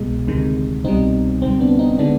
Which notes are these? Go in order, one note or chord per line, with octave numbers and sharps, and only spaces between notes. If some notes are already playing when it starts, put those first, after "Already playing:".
Already playing: C2 B2 G#3
D2 C3 D#3 G#3
C2 B2 G3 C4 D#4
D2 C3 G3 C4
B3 D4
C4 D#4
D3 G#3 B3 D4